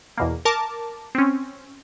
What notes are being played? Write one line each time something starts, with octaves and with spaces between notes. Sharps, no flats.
E2 B2 A#3
A#4 A5 D6
C4 C#4